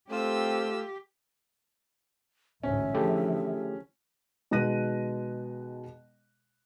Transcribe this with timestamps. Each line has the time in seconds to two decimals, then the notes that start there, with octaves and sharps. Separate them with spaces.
0.10 A3 C4 F4 G4 E6
2.63 A1 D2 G#2 C#4 E5
2.95 D3 E3 F3 A3 G4 G#4
4.51 B2 D#3 G#3 F#6 A#6 D#7